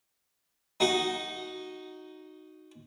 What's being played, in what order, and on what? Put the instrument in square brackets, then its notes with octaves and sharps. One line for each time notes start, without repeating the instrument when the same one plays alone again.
[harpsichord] D#4 F#4